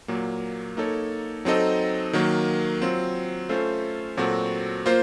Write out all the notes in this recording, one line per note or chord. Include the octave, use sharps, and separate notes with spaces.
A#2 F#3 A#3
A#3 D#4 A4 C#5
F#3 C4 D#4 A4 D#5
D#3 F#3 A#3
F#3 C4 F4
A3 C#4 F4 A4 C5
A#2 F#3 C4 F#4 A4
A#3 F4 C5